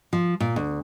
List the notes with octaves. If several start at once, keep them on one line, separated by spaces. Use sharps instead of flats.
F3
A#2
D2